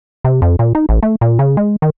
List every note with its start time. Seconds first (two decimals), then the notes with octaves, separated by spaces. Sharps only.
0.24 C3
0.42 F2
0.59 A#2
0.75 D#4
0.89 A1
1.03 A3
1.21 A#2
1.39 C#3
1.57 G#3
1.82 D#3